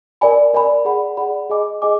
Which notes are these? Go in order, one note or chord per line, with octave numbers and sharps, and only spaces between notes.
A#4 D5 G#5 B5
A#4 D5 G#5 B5
G#4 D5 F#5 B5
G#4 D5 F#5 B5
G#4 D#5 G#5 D6
G#4 D#5 G#5 D6